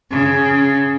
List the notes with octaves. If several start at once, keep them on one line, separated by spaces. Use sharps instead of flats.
C#3